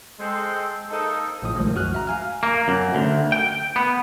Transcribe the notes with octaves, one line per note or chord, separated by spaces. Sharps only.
G#3 C4 A4
A#3 C4 D#4 A4
A#1 A2 F3 D#6
C2 D#3 F3 G#3 A3
F#2 F#4 F6 F#6
E5 A#5
F5 G#5 F6
A#3
F#2
D2
G5
B3